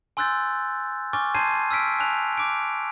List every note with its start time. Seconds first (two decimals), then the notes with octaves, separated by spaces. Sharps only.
0.17 G#5 C6 E6 F#6 G6 A6
1.13 G#5 C#6 D6 F6 A6
1.35 A5 C6 G6 G#6 C7 D#7
1.71 E6 F6 B6 D7
1.99 G#5 A5 F#6 F7
2.37 D6 D7